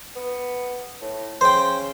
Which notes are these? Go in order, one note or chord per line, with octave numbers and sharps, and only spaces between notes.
B3
A2
C#3 C5 G5